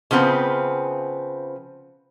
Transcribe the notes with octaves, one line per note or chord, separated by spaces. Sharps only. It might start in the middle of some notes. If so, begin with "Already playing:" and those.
C#3 F3 B3 C4